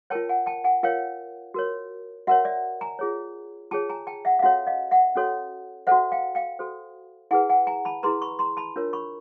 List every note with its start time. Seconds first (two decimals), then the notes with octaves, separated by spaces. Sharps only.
0.10 F4 A#4 C#5 G5 A5
0.29 F#5 G#5
0.46 G5 A5
0.64 F#5 G#5
0.83 F4 A#4 C#5 F5 G5
1.54 F#4 A#4 C#5
2.27 F#4 A#4 C#5 E5 F#5
2.45 D5 E5
2.81 G#5 A#5
2.99 F4 G#4 C#5
3.71 F4 G#4 C#5 G5 A5
3.89 G#5 A#5
4.07 G5 A5
4.25 E5 F#5
4.39 F5
4.43 C#4 F#4 A4 C#5 E5 F#5
4.67 D#5 F5
4.91 E5 F#5
5.16 C#4 F#4 A4 C#5
5.87 F#4 A4 C5 E5 F#5
6.12 F5 G5
6.35 F5 G5
6.59 F#4 A4 C5
7.31 E4 G#4 B4 F#5 G#5
7.49 F#5 G#5
7.67 G#5 A#5
7.85 A5 B5
8.03 E4 G#4 B4 A#5 C6
8.22 B5 C#6
8.39 A#5 C6
8.57 A5 B5
8.76 D4 F4 A#4 C#5
8.93 B5 C#6